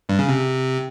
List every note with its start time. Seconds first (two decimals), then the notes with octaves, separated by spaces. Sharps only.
0.09 G2
0.19 C#3
0.29 C3